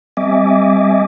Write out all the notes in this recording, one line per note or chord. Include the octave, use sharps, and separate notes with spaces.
G3 C4 D#5 E5 G#5 D6